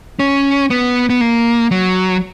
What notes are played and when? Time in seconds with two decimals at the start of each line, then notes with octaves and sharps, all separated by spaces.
0.19 C#4
0.70 B3
1.10 B3
1.21 A#3
1.71 F#3